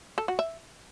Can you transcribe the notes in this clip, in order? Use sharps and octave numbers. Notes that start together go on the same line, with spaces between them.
A4
F#4
E5